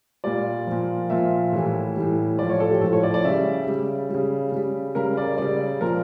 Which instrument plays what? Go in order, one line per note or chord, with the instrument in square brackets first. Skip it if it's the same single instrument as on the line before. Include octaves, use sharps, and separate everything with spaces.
[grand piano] A#2 G3 D5
A#2 F3
A#2 F3 E5
A2 E3 G3
A2 E3 G3
A2 F3 D5
C#5
A4
G4
A2 F3 A4
C#5
D5
D5
C#3 G3 E5
C#3 G3
C#3 G3
C#3 G3
C#3 G3 A#4
D5
C#3 G3 D5
A#2 F3 A#4